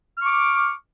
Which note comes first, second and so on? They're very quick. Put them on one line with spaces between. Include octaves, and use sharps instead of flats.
F6 C#6 D6